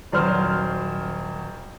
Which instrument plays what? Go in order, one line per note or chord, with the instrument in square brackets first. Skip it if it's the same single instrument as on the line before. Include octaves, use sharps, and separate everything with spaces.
[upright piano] D#1 F#3 C5 F6